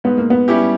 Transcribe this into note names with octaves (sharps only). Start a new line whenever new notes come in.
G#2 B3
A#3
B3
G3 C#4 E4 G4